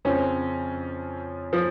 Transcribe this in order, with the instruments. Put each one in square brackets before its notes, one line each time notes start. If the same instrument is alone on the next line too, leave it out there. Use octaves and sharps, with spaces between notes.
[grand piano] F2 C#3 F3 C4 [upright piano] C#4
[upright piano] F3